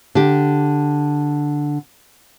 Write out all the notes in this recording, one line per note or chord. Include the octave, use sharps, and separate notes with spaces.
D3 G4